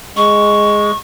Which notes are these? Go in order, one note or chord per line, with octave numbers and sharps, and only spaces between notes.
G#3 C#6